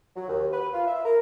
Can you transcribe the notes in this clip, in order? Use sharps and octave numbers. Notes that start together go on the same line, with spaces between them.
F#3
D#2
B4
F4
E5
A#4